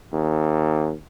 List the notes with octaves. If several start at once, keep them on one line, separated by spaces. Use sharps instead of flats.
D#2